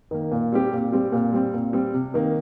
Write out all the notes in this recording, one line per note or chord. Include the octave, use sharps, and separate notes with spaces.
D#3 A#3
A#2
G3 C4 G4
A#2
G3 C4 G4
A#2
G3 C4
A#2
G3 C4
C3
D#3 A#3